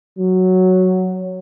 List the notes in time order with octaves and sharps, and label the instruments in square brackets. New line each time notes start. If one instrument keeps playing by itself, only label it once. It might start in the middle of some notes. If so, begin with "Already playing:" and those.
[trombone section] F#3